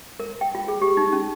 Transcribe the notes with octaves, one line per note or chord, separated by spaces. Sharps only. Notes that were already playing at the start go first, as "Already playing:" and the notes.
A#4
G5
F4
G#4
G4
D#4
C#4